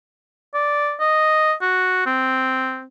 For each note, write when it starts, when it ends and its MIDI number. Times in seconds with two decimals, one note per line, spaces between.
0.54 0.94 74
1.00 1.53 75
1.62 2.06 66
2.06 2.84 60